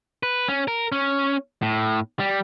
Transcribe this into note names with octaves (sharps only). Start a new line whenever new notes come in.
B4
C#4
A#4
C#4
A2
G3